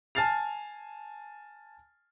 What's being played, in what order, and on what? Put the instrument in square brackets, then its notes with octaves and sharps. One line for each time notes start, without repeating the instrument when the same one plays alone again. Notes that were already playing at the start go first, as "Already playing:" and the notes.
[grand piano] G#5 A5 F6 A6 C7 F7